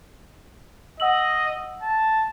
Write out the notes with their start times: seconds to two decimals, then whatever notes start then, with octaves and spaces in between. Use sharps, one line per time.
1.00 D#5 F#5 E6 F#7
1.83 A5